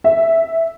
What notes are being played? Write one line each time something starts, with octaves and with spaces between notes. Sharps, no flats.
E5